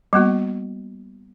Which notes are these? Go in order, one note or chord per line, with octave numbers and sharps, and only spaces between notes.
G3 A#3 B3 F#4